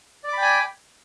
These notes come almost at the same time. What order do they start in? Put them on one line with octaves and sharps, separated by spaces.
D5 D6 B5 G5 G#5